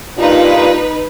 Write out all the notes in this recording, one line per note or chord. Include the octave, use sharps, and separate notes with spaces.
G2 A#2 D#4 F4 B4